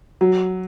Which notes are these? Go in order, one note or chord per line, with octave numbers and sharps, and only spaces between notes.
F#3